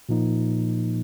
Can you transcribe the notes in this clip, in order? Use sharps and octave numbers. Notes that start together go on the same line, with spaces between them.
A#2 F3 A#3 D#4